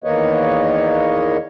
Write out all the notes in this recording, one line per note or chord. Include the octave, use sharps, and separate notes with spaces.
E2 D#3 A#3 B4 C#5 D#5